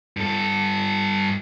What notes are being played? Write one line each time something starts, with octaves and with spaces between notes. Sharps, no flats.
G2 A4